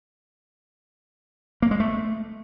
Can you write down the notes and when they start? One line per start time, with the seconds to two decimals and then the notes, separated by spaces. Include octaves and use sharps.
1.62 A#3
1.71 G#3
1.80 A3